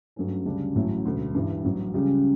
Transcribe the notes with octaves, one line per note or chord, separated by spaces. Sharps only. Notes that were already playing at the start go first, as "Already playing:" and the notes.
G2 F#3 A3 C#4
D2 C#3 G3 D4
A1 A2 F#3 C#4 E4
E1 D2 D3
G2 E3 G3
A1 G2 F#3
C#2 C#3 G3 C#4 G4